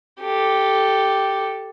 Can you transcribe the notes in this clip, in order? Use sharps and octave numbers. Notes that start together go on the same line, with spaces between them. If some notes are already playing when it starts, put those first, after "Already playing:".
G4 A4